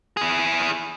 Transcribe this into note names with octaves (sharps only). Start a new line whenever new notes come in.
E4 G#4